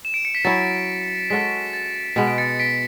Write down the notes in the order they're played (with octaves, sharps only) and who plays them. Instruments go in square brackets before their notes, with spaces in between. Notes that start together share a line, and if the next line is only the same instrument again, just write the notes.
[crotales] E7
D7
C#7
B6
[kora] F#3 C#4 E4 [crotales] A6
[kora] G#3 C#4 F#4 A4 [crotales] B6
[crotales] A6
[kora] B2 G#3 B3 [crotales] B6
[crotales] D7
A6 C#7
B6 D7